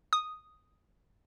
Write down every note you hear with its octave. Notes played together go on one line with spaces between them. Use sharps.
D#6